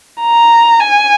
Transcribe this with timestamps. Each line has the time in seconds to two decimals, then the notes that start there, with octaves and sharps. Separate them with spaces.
0.21 A#5
0.80 G#5